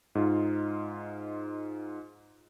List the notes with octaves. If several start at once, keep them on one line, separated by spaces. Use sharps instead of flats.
G#2 D#4 F4